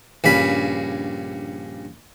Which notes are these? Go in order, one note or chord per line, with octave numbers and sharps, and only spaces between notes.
A#1 G2 C#3 B5